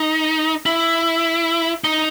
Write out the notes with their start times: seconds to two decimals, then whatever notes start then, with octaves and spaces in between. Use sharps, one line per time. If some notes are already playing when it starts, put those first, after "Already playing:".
Already playing: D#4
0.66 E4
1.84 D#4